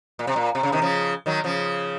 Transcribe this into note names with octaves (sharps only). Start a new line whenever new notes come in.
A#2
C3
A#2
C3
C#3
C3 D#3
C#3 F3
D#3 F#3
C#3 F3